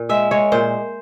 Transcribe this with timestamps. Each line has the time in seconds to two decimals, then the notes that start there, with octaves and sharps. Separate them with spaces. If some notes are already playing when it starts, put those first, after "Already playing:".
Already playing: A#2
0.09 G#3 E5
0.31 G#3 C#5
0.52 A#2 C5